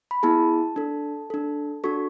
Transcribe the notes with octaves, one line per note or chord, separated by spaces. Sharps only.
B5
B3 E4 G#4 A5
D4 A4
D4 A4
D4 F#4 A4 C#6